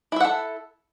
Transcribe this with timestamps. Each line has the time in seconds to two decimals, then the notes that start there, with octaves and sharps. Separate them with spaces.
0.12 E4
0.16 E5
0.20 F#5
0.25 A4